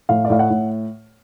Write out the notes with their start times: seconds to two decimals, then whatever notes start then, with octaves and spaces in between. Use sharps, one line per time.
0.09 A2 F5
0.25 D5
0.30 A2 F5
0.39 F#5
0.50 A2